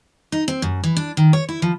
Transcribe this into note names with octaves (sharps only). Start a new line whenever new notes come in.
D#4
C4
F#2
E3
D4
D#3
C#5
E4
F3